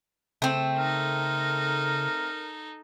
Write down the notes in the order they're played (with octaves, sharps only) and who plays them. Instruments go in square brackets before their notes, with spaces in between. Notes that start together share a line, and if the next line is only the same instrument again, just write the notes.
[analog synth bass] C#3 [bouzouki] A3 C4
[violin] D#4 A4 [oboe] A#4